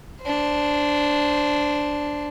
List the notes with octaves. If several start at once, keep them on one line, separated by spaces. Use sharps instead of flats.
D4 C5